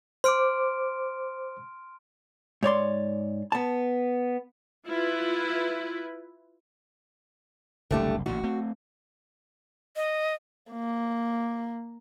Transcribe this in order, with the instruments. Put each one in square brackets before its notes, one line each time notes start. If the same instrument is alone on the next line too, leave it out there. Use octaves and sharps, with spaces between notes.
[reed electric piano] C5 D6 [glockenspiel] C6 F6 D7
[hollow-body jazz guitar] G#2 C#5 D5 C6
B3 A5
[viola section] E4 F4 B4
[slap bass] F#1 C2 [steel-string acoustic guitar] D3 A3 G4
[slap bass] A1 A#2 D3 [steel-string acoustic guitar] F#4
[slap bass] A3 C4
[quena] D#5
[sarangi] A#3